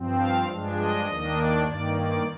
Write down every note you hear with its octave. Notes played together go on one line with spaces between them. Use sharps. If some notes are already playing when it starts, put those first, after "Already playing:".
Already playing: G2 F3 C4
F5
G2 F3 G#3 D4
D#5
D#2 D#3 A#3 D4
D5
G2 D#3 A#3 D5
D5